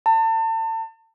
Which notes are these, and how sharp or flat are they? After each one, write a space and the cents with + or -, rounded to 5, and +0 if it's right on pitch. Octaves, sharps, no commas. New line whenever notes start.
A5 +35